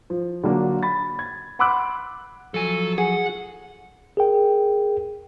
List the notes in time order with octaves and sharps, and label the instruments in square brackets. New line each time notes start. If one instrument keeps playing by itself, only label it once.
[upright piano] F3
D3 F#3 A#3 D4
B5 A6
G#6
F#5 B5 C6 D6 E6 F#6
[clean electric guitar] F3 F#3 G#5 [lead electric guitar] A4
[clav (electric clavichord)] G#4 [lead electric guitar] F#5
[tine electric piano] G#4 A#4 G5